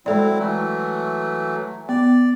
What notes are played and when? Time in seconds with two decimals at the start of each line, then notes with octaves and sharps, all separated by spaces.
0.06 F#3 G#3 C4 E4 A4 D5
0.39 E3 F#3 A3
1.89 B3 D5